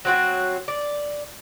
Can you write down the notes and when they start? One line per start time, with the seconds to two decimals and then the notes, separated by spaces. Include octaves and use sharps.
0.05 F#3 C4 F#4
0.68 D5